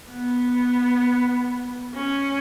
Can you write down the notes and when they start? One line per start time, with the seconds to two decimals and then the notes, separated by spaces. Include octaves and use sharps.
0.11 B3
1.94 C#4